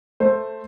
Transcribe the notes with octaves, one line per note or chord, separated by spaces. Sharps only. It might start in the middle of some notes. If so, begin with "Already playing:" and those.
A3 C5